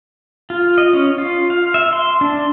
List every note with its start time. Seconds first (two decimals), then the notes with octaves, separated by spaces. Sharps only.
0.50 F4
0.78 D#5
0.93 C#4
1.18 F4
1.50 F5
1.74 E5
1.93 C6
2.21 D4